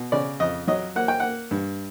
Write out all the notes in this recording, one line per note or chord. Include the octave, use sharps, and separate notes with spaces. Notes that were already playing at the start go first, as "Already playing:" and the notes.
Already playing: B2
C#3 D5
F2 D#5
F#3 D#5
A#3 F#5
G5
A#3 F#5
G2